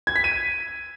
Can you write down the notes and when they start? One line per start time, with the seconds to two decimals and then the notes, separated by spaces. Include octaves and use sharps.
0.07 G#6
0.16 B6
0.24 D#7